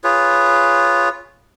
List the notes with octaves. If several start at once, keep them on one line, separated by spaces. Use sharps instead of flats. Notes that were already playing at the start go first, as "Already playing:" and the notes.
F4 G#4 B4 C#5